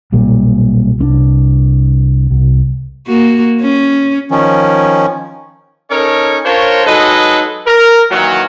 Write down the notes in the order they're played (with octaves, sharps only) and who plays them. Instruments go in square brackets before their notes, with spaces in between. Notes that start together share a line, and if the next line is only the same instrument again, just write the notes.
[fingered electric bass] B1 A#2 G3
C2 C4 D4
C2
[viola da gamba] A#3 F#4
C#4
[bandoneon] D#3 F3 C#4
[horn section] C#4 D#4 A4 A#4 C#5
D4 F4 A#4 C5 C#5
F#3 G#3 D#4 A4 B4 D#5
A#4
A#2 D#3 E3 F#3